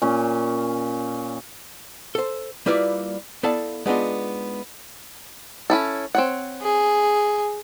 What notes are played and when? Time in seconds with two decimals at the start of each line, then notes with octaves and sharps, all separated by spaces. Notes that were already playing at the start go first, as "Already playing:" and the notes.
0.02 A#2 C#4
2.15 A4 C5
2.66 G3 A#3 E4 F4 B4 D5
3.43 B3 E4 A4 D5 F5 A5
3.86 G#3 B3 D4 D#4 F4
5.70 C#4 E4 A4
6.15 C4 C#5 F#5
6.62 G#4